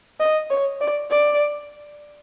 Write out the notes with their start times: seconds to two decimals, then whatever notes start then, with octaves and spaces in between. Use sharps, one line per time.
0.20 D#5
0.50 C#5
0.80 D5
1.10 D5